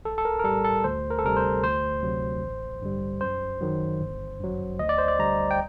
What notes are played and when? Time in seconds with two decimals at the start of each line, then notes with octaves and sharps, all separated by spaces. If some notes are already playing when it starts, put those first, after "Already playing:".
0.05 A#1 A4
0.18 A4
0.25 A#4
0.39 A#4
0.44 A2 G3 A4
0.65 A4
0.84 D2 C5
1.10 A#4
1.19 A4
1.24 C3 G3 A#4
1.37 C5
1.63 D2 C5
2.03 C3 F#3
2.42 A1
2.82 G2 D3 G3
3.21 F#2 C5
3.61 D#3 F#3
4.01 G1
4.40 F#2 F#3
4.79 D2 D#5
4.89 D5
4.98 C5
5.08 D5
5.19 D3 G3 A#5
5.51 G5